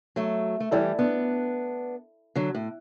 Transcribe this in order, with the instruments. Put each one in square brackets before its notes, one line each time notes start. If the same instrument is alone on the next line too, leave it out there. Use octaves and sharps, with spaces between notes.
[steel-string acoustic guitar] F#3 A3
A3
[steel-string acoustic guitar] E3 G3 [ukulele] E4 A4 D5 G5
[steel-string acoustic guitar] B3 D4
D3 F#3
A2